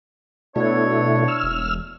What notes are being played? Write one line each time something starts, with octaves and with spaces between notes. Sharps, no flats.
B2 A3 D4 E4 C#5
E6 F6
E1